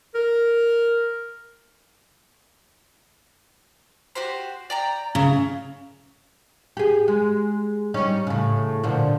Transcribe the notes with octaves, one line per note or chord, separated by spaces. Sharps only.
A#4
F#4 G4 C5
D5 G5 A#5
C#3 E4
G4 G#4
G#3
G3 C#4 D#4
A2 C#3
A#2 D3 F3